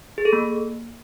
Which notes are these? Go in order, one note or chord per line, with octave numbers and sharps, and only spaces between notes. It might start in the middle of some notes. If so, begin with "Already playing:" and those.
G#4
A4
A#3